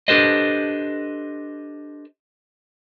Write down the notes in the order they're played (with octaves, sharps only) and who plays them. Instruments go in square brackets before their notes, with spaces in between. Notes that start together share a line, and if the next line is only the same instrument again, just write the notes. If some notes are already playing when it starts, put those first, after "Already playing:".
[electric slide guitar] D4 G4 A4 B4 C5 D#5